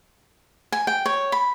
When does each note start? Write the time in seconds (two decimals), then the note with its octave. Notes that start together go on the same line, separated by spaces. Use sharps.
0.72 G#5
0.87 G5
1.06 C#5
1.32 B5